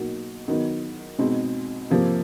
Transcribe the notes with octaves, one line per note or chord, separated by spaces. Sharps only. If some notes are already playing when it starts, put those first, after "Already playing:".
Already playing: B2 F#3 A#3 D#4 F#4
D#3 F#3 B3 D#4
B2 G#3 C4 D#4
C3 F3 A#3